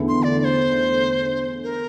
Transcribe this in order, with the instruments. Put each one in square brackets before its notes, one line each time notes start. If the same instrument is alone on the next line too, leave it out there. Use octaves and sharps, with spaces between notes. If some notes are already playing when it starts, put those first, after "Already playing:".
Already playing: [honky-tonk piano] E2 D3 A3 E4
[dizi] C6
D5
D5
C5
A#4